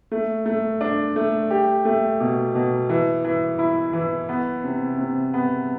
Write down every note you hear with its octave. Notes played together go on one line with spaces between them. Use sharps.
A3
A3
D4
A3
G4
A3
B2
B2
E3
E3
E4
E3
B3
C3
C3
B3